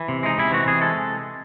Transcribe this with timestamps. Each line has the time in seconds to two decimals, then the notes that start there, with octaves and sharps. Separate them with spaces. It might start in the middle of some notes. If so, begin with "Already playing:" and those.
Already playing: E3
0.08 C3
0.23 G#3 D#4
0.38 C3 E4
0.52 E3 F#4
0.66 C3 G#4
0.81 G#3 A4